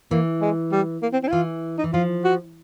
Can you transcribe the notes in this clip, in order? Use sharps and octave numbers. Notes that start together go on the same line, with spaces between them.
E3 A#3
G#3
G3
A#3
C4
C4
E4
E3 F4
D#4
E3
F3 F4
F#4